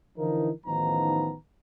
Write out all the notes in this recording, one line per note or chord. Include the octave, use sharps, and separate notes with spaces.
D3 E3 F3 D#4 E4 A#4
A1 D#3 F3 B3 D#4 A#5